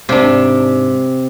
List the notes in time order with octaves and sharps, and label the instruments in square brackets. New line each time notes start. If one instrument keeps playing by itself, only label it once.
[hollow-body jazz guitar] G#2 D4 [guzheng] C3